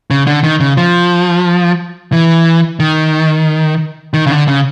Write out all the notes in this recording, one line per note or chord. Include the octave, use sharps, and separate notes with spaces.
C#3
D3
D#3
C#3
F3
E3
D#3
D#3
C#3
D3
C#3